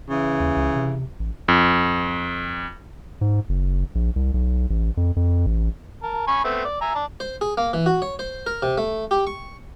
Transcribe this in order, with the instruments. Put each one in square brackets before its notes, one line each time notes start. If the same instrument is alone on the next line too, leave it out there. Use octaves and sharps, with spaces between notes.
[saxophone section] C#3 E3
[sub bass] D#2
C#2
C3
A1
[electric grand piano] F2
[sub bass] G#2
F#1
A#1
C2
B1
A1
F2
F2
A1
[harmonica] A#4 A5
G#5 B5 C#6
A3 B3 C4
D5
E5 G#5 A#5
D5 A5
[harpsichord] C5
G#4
A#3
E3
F#4
C#5
C5
A#4
C3
A3
G4
C#6